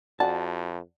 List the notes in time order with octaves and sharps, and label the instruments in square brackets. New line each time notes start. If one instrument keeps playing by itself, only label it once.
[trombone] F2 [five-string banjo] F#4 [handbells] D5 F#5 G#5 [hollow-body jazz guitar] A5